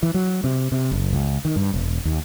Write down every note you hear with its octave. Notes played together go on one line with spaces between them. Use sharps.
E3
F#3
C3
C3
F#1
C#2
D#3
G2
E1
D#2